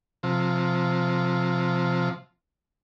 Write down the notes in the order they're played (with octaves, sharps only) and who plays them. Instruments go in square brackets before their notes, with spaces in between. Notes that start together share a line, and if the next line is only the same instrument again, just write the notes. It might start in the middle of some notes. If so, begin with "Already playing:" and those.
[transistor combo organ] C3 F3